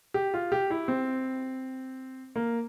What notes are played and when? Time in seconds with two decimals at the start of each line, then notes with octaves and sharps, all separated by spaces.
0.14 G4
0.34 F4
0.52 G4
0.71 E4
0.88 C4
2.36 A#3